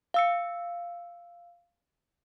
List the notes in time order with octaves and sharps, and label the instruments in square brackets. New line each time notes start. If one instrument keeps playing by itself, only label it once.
[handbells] F5 E6 C#7